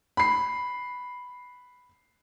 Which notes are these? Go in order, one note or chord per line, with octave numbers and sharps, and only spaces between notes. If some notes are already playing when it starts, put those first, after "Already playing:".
B5 C7